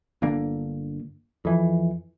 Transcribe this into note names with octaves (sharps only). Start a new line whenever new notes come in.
G1 D3 A#3
F2 E3